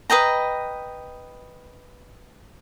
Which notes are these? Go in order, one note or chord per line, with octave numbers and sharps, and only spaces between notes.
B4 D#5 G5 A#5